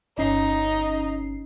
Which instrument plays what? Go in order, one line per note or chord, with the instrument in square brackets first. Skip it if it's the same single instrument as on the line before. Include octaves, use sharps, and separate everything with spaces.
[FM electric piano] G1 C#4 C7 [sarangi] D#4